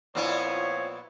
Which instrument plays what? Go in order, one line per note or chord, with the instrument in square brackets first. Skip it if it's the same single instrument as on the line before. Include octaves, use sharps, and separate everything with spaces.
[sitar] A#2 B3 E4 [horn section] F3 C4 C#5